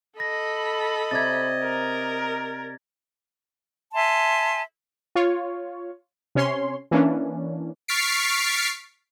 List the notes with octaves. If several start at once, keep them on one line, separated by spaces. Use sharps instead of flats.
A4 D#5 B5 A#6
C3 D5 A#5 G#6 A6
A#4
E5 G#5 A5 C6
F4 C#5
C3 C#4 C#5 C6
E3 A#3 C#4 D4
C#6 F6 A6 B6 C7 D7